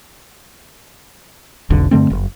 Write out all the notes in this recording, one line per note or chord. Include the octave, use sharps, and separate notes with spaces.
F1 B1 F2 D3
G2 D3 A3 C4
F#1